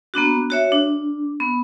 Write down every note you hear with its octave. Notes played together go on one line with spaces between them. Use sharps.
A#3 B3 D4 F#4
F#4 C#5 E5
D4
B3